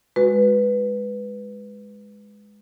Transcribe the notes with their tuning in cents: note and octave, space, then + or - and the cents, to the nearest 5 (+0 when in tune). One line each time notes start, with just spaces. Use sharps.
G#3 -5 F#4 +0 B4 +0